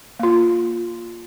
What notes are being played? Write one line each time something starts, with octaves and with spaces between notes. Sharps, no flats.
A#3 F4